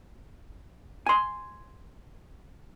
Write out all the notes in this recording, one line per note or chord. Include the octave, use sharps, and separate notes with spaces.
G#5 C6